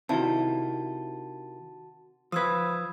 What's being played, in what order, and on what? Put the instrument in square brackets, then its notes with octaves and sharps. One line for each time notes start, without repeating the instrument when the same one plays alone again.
[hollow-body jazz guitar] C3 D#3 E4 [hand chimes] F#4 A5
[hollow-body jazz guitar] F3 B4 [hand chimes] D#6 E6 G#6